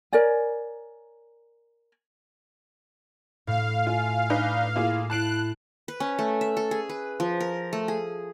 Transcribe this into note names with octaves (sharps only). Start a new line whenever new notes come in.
A#4 C#5 D5 G#5
A2 F5
F4 G#5
D4 D#4 B4
A#3 E4 F4 G#4
E4 A5 F#6 C7 D7
B4
C#4
A3
E5
A4
G#4
B4
F3
A#4
A3
G#4